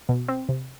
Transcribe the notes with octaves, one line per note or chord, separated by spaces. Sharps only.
B2
C4
C3